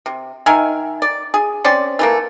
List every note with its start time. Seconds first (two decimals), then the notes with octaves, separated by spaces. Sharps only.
0.06 C3
0.46 D#3 A#4 E5 G#5
1.02 D5
1.34 G#4
1.64 C4 C#4 C5 D5
1.99 E3 A3 A#3